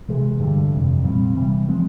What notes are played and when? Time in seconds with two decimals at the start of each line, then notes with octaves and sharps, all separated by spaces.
0.08 C3 E3 G#3
0.40 G2 D3 G3
0.72 F2 C3 E3
1.04 A#2 G3 C4
1.35 C3 E3 G3
1.68 F3 G#3 C4